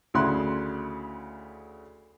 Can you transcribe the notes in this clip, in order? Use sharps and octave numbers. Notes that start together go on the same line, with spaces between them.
D2 C#3 E4 C6 F#6